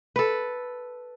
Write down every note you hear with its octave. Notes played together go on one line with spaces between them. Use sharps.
A4 B4